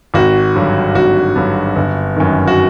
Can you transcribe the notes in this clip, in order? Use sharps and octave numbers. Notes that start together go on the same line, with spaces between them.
G#1 F#4
G2 D3 F#3
G#1 F#4
G2 D3 F#3
G1
F#2 D#3
F#4